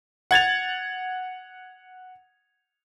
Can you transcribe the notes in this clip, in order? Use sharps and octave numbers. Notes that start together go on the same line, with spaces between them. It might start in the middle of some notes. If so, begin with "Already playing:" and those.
F#5 G#6 A6 F7